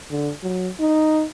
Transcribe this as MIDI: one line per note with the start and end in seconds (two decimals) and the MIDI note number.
0.11 0.30 50
0.43 0.69 54
0.80 1.24 63